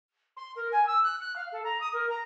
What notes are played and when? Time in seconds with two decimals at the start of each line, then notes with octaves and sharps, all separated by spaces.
0.37 C6
0.56 A#4
0.72 G#5
0.87 E6
1.04 F#6
1.21 F#6
1.36 F5
1.52 A4
1.64 A#5
1.81 D#6
1.93 A#4
2.10 A#5